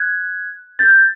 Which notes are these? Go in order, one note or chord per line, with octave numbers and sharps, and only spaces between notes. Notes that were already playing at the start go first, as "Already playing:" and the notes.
Already playing: F#6 G#6
G6 A6